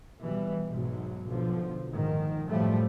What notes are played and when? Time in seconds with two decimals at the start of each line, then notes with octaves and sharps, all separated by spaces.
0.21 B2 E3 G3
0.69 B1 G#2 B2 F#3
1.28 B1 D3 F3
1.90 A#1 G#2 D#3
2.49 F#2 A2 F3 G3 A3